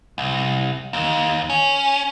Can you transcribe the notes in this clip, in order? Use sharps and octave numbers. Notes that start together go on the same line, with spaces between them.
C2
D#2
C#4